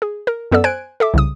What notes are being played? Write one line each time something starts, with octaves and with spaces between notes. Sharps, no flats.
G#4
A#4
F#2 B3 A4 D5 E6
C5 G#5 F#6 G#6 D7
A4 E5 D6
C2 C#3 D#6